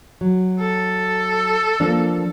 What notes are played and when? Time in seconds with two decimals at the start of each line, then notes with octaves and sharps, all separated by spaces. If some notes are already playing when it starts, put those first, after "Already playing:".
0.21 F#3
0.59 A4
1.80 F3 A#3 D4